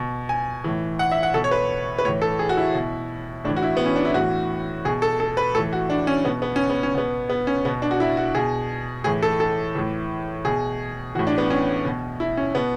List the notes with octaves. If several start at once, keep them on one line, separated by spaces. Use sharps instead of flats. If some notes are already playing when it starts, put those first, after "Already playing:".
Already playing: B2
G#5
A2 E3
F#5
E5
F#5
B2 A4
C#5
B4
B4
A2 E3 C#5
A4
G#4
F#4
E4
B2
A2 E3 D4
F#4
E4
B3
C#4
D4
E4
A2 E3 F#4
B2 G#4
A4
A4
B4
A2 E3 A4
F#4
D4
C#4
B2 B3
B3
C#4
B3
C#4
B2 B3
B3
C#4
B2 B3
D4
F#4
E4
F#4
B2 G#4
A2 E3 G#4
A4
A4
A2 E3
B2 G#4
A2 E3 F#4
D4
B3
C#4
B2
E4
C#4
B2 B3